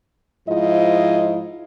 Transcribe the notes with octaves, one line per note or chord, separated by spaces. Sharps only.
G#2 F3 E4 F4 D#5